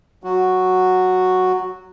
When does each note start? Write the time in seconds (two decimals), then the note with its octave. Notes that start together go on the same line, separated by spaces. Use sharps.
0.24 F#3 F#4